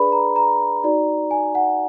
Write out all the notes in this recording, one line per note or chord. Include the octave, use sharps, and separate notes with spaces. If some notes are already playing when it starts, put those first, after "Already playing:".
Already playing: D4 G#4 B4 D5 B5
A#5
A#5
D#4 F#4 D5
G#5
F#5